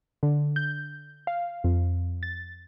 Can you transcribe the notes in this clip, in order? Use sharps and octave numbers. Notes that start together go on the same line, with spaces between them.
D3
G6
F5
F2
A6